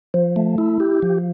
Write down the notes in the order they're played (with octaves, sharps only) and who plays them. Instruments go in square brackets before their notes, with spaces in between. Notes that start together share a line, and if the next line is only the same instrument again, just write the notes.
[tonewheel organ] F3
A3
E4
G4
F3